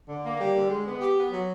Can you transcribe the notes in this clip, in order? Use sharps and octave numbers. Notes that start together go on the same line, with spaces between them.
D3
A#3
G3
D3
G#3
B3
G4
B3
F#3